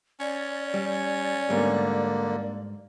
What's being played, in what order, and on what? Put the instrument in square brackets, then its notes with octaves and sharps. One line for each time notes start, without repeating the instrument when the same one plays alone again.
[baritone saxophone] C#4 [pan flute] D5
[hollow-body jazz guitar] G3
[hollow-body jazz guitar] G#2 G3 B3 [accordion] D3 A#3